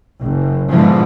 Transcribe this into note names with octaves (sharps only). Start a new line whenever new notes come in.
F#1
G#2 B2 D3 E3 F3